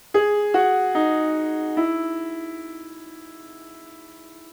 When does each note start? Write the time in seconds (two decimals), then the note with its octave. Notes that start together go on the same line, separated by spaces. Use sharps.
0.14 G#4
0.54 F#4
0.95 D#4
1.77 E4